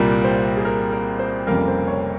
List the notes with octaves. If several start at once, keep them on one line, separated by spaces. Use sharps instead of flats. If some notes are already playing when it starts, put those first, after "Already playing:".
Already playing: C2 A#2 G3 A#3 A#4
C5
G#4
A#4
A#4
C5
F1 F2 C#3 G3 A#3 A#4
C5
C#5